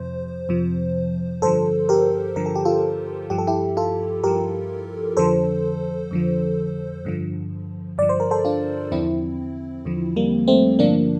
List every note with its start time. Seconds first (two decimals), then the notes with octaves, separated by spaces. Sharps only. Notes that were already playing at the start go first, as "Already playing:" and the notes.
Already playing: F2 C3 F3 C5
0.49 F2 C3 F3
1.42 G2 D3 F3 A4 C5
1.89 G4 A#4
2.36 G2 D3 F3 A#4
2.46 A4
2.55 G4
2.65 F4 A4
3.30 G2 F3 G4
3.38 A4
3.47 E4 G4
3.77 F4 A4
4.24 G2 F3 G4 A#4
5.17 F2 D3 F3 A4 C5
6.11 F2 D3 F3
7.05 G2 D3 F3
7.98 G2 D3 F3 D5
8.09 C5
8.20 A#4
8.31 A4 C5
8.45 D4 F4
8.92 E2 D3 F3 C4 E4
9.85 E2 D3 F3
10.16 G3 A#3
10.48 A3 C4
10.79 G2 D3 F3 A#3 D4